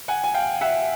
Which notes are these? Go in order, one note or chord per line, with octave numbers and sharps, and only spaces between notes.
F#5 G#5
G#5
F5 G5
E5 F#5